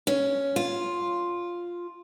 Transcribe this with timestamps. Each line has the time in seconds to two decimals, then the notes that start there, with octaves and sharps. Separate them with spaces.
0.07 C#4
0.56 F4